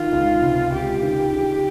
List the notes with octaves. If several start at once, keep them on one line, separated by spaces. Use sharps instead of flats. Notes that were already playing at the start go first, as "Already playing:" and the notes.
Already playing: D#3 F4
C#2
C3
C#2 G4
D#3
C#3